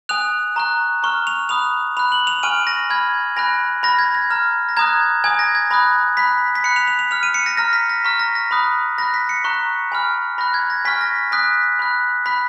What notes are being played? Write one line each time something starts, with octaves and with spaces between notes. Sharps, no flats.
G#5 D#6 F#6 F7
A#5 C#6 F#6
A#5 C#6 F6
F7
B5 D#6 F#6 F7
B5 F#6 F7
F#7
F7
G#5 C#6 F6 D#7
A#6
B5 F6 G#6
G#5 B5 F#6 A#6
B5 F6 A#6
G#6
A#6
A#5 F6
A#6
A#5 D#6 F#6 G#6
G#5 D#6 F#6 G#6
A#6
G#6
B5 D#6 F#6 A#6
B5 F#6 B6
B6
B5 F#6 C#7
F7
F7
F7
B5 F6 F7
D#7
C#7
A#6
A#5 F6 A#6
B6
A#6
A#5 C#6 F6 B6
A#6
A#6
B5 D#6 F#6
B5 F#6 A#6
B6
C#7
A#5 C#6 F#6
G#5 B5 F6
B5 F#6 A#6
G#6
A#6
G#5 C#6 F6 B6
A#6
B6
G#5 D#6 F#6 B6
B5 F#6
B5 F#6 B6